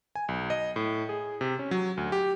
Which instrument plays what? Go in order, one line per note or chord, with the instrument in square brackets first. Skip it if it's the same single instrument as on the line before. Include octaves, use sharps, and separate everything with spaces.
[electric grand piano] G#5
B1
D#5
A2
G#4
C3
C#4
F#3
D2
G4